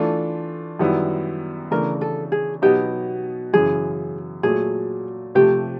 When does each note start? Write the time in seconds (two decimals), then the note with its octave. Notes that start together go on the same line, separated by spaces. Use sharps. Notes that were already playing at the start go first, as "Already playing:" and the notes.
Already playing: E3 A3 D4 F4 A4
0.79 F#2 D#3 G3 B3 E4
1.71 C#3 E3 A3 D4 A#4
2.01 A4
2.32 G#4
2.62 B2 F#3 B3 D#4 G4
3.53 F#2 C#3 E3 G#4
4.43 A#2 F#3 A3 G#4
5.35 C3 F3 A3 G4